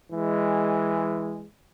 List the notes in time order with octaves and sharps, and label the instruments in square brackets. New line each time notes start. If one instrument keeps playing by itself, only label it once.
[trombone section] E3 G#3